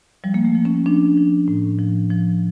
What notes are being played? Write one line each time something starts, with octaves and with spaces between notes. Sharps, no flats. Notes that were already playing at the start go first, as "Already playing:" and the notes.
F3 G3
A#3
A3
F3
C#4
F3 D4
F3
A2
F3
F3